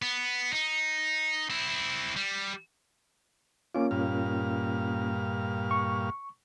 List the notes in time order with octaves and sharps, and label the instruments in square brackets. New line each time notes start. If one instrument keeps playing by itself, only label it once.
[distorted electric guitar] B3
D#4
C4 E4
G3
[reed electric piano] A#3 C#4 F4 [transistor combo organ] D6
[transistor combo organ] G2 A#2 F5
[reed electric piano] C#6